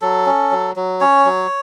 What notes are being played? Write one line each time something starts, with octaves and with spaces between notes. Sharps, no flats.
F#3 A4
C#4
F#3
F#3
C#4 C#5
F#3